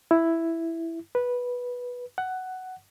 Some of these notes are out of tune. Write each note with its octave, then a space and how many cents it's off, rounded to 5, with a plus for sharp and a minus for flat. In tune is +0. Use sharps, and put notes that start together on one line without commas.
E4 +5
B4 -10
F#5 +10